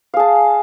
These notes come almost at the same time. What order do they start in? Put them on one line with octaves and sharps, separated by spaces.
F5 G#4 A5